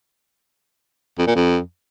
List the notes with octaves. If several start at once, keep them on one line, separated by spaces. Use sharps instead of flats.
F2
A#2
F2